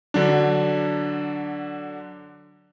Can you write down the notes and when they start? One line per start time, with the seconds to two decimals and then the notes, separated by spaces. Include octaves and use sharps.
0.14 D3 F#3 D4